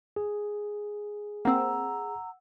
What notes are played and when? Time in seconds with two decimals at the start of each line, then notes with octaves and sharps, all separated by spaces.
0.16 G#4
1.45 A#3 C4 F#5 A#5 E6